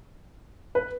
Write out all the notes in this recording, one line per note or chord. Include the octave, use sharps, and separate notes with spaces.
B4